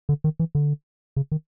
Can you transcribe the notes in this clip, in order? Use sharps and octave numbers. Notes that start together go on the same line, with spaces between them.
D3
D#3
E3
D3
C#3
D#3